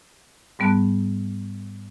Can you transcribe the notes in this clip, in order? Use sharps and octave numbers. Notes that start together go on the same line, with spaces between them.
G#2 G3 B3 A5 F#6